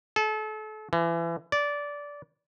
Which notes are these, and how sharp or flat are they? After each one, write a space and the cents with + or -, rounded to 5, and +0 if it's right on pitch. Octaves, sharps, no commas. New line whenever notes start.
A4 -35
E3 +30
D5 -15